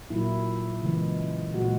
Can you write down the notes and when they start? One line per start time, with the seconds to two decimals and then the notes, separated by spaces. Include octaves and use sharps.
0.10 A#2 F#3 A#3 E4
0.82 C#3 E3 G#3
1.54 A#2 G#3 F#4